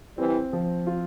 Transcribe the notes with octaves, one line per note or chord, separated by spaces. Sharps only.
E3 G3 C4
F3
F4